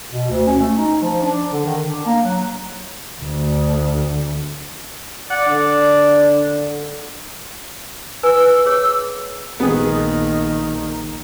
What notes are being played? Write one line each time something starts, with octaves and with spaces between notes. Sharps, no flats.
B2
D2
C#4
A3
D#4
F3
D4
D3
D#3
D4
A#3
F#3
D2
D5 F#5
D3 D4
B4 G#5 E6
G#4 C#5
A#1 D#3 B3 G#4